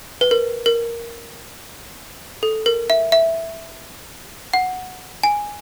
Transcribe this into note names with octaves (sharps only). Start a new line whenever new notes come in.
B4
A#4
A#4
A4
A#4
E5
E5
F#5
G#5